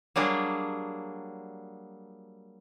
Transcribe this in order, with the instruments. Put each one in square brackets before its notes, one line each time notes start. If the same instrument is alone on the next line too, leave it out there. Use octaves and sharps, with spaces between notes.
[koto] F#3 G3 A#3 D4 G#4 A#4